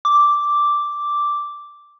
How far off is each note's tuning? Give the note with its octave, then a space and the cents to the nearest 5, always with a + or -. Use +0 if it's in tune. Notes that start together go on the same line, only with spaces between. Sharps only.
D6 -5